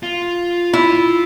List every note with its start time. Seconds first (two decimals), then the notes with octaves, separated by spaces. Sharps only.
0.03 F4
0.73 E4